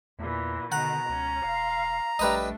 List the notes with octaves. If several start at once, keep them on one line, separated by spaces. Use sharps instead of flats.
E2 A#2 E3
B2 D3 D#3 F#5 A#5
C#2 C#4
E1 F5 C6
A#1 G3 A3 D4 B4 D#5